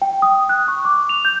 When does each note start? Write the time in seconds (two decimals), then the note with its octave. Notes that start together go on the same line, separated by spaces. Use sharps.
0.02 G5
0.22 D#6
0.49 F#6
0.68 C#6
0.85 D6
1.09 F7
1.25 G6